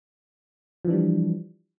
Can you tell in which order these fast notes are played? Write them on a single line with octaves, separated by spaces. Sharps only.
F3 E3 D4 G3